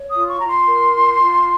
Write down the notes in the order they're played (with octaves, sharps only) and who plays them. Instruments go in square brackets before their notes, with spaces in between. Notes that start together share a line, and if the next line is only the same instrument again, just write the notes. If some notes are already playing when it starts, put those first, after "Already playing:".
Already playing: [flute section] C#5
D#6
F4
C#6
F4 A#5
C6
A#4
F4
F4